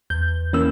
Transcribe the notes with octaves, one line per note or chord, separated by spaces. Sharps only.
E2 G6
E3 A#3 C#4 E6